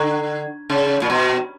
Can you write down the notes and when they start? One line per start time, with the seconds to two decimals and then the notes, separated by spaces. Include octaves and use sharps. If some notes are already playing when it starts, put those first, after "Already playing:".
Already playing: D3
0.70 C#3
1.02 A#2
1.10 B2